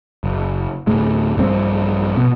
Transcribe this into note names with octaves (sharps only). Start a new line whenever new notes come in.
F#1
D2 A2 G#3
A#1 G2 D3 C4
B2